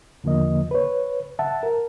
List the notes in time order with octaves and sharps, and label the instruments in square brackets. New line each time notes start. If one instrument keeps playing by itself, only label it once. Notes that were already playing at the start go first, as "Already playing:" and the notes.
[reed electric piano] E2 D3 F3 A#3 D#5
B4 C#5
E5 F#5 A5
A#4